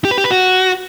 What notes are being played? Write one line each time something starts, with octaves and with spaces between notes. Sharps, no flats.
G4
B4
G4
B4
F#4